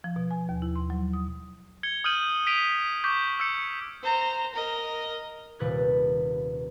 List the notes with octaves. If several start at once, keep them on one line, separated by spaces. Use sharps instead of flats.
F3
B2
G#5
D#2
E4
C6
F#3
D#6
G#6 C#7 G7
D#6 F6 G6 D#7 F#7
D#6 B6 D7 D#7 F7
C#6 D6 G6 B6
E6 G6 C#7
C5 A#5
A#4 D#5
D#1 C3 B4 F#6 G#6 A6